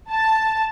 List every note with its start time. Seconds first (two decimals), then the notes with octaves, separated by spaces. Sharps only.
0.11 A5